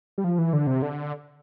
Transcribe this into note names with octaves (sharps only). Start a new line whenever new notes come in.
G3
F3
E3
D3
C3
D3